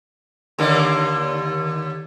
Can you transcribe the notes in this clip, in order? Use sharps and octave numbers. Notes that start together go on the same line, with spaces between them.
D#2 D3 A#3